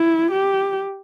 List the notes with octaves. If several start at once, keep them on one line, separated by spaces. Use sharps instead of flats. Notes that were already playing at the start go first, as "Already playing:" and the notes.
Already playing: E4
G4